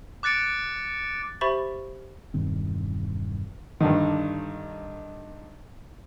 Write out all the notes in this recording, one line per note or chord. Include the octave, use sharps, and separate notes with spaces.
D6 F#6 A6 C#7 D7
G4 C5 E5 B5 C#6 A6
E1 G2 D#3 C4
G2 D3 D#3